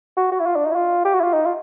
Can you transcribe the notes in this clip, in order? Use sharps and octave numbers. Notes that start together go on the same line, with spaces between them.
F#4
F#4
E4
F4
D4
D#4
E4
F4
G4
F#4
E4
F4
D#4
F4